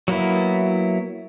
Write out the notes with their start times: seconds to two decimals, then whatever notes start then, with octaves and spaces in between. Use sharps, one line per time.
0.08 F#3 A#3 B3 E4